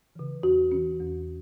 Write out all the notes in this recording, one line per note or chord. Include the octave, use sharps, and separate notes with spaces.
C#3 E3
E2 F#4
E3 C#4
E2